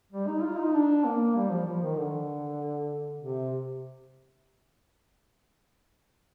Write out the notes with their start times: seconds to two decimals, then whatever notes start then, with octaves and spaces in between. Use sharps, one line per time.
0.12 G3
0.27 D#4
0.43 F4
0.58 D#4
0.74 D4
1.05 A#3
1.35 G3
1.50 F3
1.66 F3
1.82 D#3
1.97 D3
3.20 C3